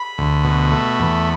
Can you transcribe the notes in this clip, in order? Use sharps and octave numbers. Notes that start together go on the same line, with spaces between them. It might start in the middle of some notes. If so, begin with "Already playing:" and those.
Already playing: B5
D2
B2
A3
E2